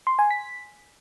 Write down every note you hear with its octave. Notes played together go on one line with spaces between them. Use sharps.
C6
G#5
B6